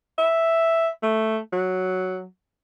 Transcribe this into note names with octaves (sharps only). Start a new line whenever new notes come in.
E5
A3
F#3